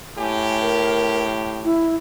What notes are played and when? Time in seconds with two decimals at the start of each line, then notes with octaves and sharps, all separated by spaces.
0.18 A2 G4 G#5
0.61 A#4
1.64 E4